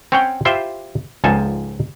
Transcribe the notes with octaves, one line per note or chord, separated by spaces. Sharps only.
C4 C#4 C#5 F#5 G5
E4 F4 G4 C5 E5
C#2 G#2 F3 C4 A4 G#5